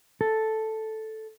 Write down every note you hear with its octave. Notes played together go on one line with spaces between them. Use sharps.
A4